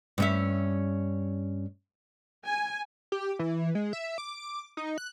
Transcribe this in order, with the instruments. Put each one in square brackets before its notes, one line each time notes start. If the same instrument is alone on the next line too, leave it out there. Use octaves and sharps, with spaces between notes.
[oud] G2 C#4 E5
[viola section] G#5
[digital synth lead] G4
E3
G#3
E5
D6
D#4
F#6